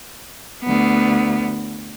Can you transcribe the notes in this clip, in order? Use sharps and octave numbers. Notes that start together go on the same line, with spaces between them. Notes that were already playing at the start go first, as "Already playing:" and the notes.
D2 B3